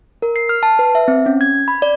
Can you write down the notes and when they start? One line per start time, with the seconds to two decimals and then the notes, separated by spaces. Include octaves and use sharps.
0.22 A#4
0.36 C7
0.49 F6
0.63 A5
0.79 B4
0.95 E5
1.08 C4
1.26 C#4
1.41 G#6
1.68 B5
1.82 D5